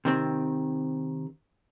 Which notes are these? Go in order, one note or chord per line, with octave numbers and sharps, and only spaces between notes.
C3 D#3 C4